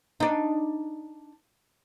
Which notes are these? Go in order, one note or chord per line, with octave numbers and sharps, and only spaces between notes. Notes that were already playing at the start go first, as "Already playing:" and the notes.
D4 D#4